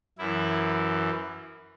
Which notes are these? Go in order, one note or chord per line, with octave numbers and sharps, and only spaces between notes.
F#2 E3 E4